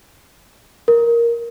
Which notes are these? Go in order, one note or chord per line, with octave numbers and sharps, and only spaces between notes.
A#4